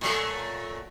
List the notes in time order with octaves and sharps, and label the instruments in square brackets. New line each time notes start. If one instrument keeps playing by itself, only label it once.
[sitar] A#2 F#3 A3